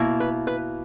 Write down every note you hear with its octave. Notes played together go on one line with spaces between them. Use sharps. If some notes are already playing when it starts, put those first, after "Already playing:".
Already playing: B2 A#3 E4
B4
B4